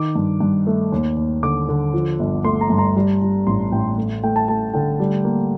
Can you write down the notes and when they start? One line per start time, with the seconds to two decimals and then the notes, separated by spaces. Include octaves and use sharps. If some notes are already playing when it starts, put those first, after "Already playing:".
Already playing: D#3 D6
0.15 G2
0.40 G2
0.67 A3
0.92 D#2
1.17 D#2
1.43 D3 D6
1.69 D3
1.93 F3
2.19 G1
2.44 A3 C6
2.61 A#5
2.70 G2
2.78 A#5
2.96 G3
3.22 G3
3.47 A1 C6
3.72 A1 G5
3.98 A3
4.23 A3 G5
4.36 A5
4.48 A3 A5
4.74 D3 G5
5.00 G3
5.24 A#3